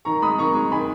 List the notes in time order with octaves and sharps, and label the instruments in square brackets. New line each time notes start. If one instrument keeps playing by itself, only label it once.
[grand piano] D#3 A#5 C#6
G#3 B5 D#6
D#3 A#5 C#6
G#3
D#3 G#5 B5